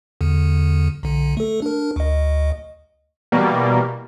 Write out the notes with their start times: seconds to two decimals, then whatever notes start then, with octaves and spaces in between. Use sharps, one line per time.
0.21 E2 D3
1.03 B1 D3
1.37 A3 A4
1.62 D4 A#4
1.96 D2 D#5
3.32 B2 E3 G3 A#3